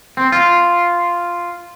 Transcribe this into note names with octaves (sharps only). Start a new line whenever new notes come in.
C4
F4